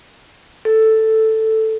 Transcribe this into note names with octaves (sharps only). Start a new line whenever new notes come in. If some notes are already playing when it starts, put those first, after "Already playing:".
A4